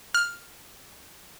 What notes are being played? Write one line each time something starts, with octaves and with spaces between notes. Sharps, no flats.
F6